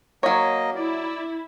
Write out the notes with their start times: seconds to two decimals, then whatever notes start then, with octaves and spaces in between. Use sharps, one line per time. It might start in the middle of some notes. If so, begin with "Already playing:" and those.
0.23 F#3 A#3 C#5 D#5
0.76 E4 D5